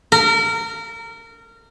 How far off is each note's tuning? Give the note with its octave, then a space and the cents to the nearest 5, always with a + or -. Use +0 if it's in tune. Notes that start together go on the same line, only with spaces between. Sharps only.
A#4 -25